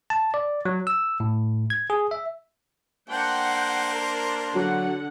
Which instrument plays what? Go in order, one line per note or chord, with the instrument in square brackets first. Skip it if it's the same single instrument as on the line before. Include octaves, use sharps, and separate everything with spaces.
[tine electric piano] A5
D5
F#3
E6
A2
G#6
G#4
E5
[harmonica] A#3 D4 C5 [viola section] F#5 G5
[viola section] A#4
[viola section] D3 F#5 [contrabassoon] F#3